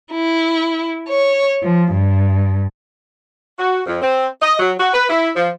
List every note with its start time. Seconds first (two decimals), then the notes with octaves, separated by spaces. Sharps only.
0.12 E4
1.09 C#5
1.62 F3
1.92 G2
3.59 F#4
3.86 F2
4.02 C4
4.42 D#5
4.59 F#3
4.78 F#4
4.94 B4
5.09 E4
5.36 F3